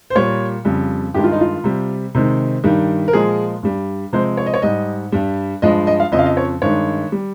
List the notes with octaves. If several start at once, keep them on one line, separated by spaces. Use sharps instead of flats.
C5
A#2 G3 C#5
F2 C#3 G3
G2 D#3 G#3 G4
F4
D#4
F4
C3 G3
C3 D#3 G#3
G2 D#3 G3
A#4
A#2 F3 G#3 G#4
G2 G3
C3 F3 G#3 C5
C#5
D#5
C#5
G#2 G3 D#5
G2 G3
G2 F3 G#3 D#5
D#5
F5
F2 C#3 F3 D#5
F5
D#5
C#5
G2 D#3 G#3 C#5
G3